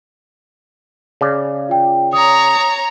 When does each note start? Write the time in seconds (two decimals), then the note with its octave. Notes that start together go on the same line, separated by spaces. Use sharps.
1.21 C#3 D5
1.69 F4 G5
2.13 C#5 A#5 D#6